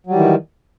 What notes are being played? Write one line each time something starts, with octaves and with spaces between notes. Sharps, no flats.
D#3 E3 F#3 G3